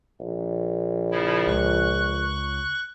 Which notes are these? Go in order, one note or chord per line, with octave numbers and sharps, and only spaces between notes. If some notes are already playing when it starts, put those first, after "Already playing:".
A#1
C#3 F3 E4
C#2 C#6 F#6